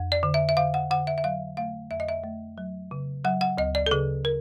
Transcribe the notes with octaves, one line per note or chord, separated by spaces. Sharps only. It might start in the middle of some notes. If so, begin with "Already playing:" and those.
Already playing: F2
D5
D3
E5
E5
D3 F5
F#5
D3 F#5
E5
E5
F#3 F5
A3 F5
F2 E5
D#5
E5
A3
F#3
C#3
F#3 F#5
F#5
D2 D#5
D5
A4
C#3 G#4
A#4